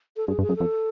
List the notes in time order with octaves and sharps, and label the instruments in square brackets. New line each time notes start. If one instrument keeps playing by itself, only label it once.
[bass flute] A4
[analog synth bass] G2 [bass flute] G#4
[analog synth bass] G2
[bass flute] G#4
[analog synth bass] F#2
[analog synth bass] F2 [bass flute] A4